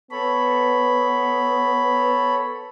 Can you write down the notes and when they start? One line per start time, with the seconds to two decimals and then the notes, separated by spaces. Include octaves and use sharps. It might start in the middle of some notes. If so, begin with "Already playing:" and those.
0.11 B3 A4 C#5 B5